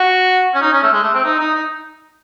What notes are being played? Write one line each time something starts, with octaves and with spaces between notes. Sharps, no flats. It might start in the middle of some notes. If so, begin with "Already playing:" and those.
Already playing: F#4
C#4
D#4
C#4
A3
G#3
A3
C4
D#4
D#4
D#4